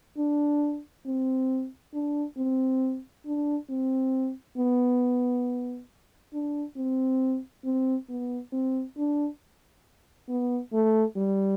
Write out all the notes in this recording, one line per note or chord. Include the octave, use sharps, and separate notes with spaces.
D4
C4
D4
C4
D4
C4
B3
D4
C4
C4
B3
C4
D4
B3
A3
G3